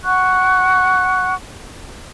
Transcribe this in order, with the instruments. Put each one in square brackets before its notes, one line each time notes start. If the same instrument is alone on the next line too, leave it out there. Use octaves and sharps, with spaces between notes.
[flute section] F#5 C#6 F#6